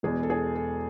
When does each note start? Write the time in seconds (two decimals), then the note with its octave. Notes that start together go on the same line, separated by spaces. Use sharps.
0.03 E1 E2 B2 G#4
0.23 A4
0.30 G#4
0.55 A4